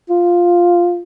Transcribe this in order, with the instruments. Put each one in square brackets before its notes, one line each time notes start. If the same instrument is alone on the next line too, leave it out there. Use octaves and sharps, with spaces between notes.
[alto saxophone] F4